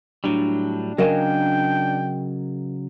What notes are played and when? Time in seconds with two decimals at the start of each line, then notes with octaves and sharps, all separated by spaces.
0.24 A2 F#3 G3 D4
0.98 C#3 F#3 A#4 D#5 F5 G5 G#5